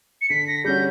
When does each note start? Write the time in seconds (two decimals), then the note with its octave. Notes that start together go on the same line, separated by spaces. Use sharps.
0.21 C#7
0.30 D3 B6
0.48 A#6
0.65 G3 C#4 F#4 G6